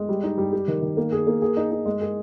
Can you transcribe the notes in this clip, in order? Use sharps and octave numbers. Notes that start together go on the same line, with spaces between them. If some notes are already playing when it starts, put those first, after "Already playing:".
Already playing: G#3
G3
D#4
G3
G4
D#3
D#3
A#3
G#4
A#3
G#4
D#4
D#4
G#3
G#4